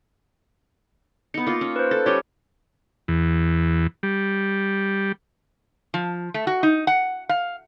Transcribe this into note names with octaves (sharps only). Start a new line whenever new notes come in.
B3 D#4 C#7
A#3 F4
C#4
B4 C5
A4
G3 C#4 G4 C#5
E2
G3
F3
A3
F#4
D#4
F#5
F5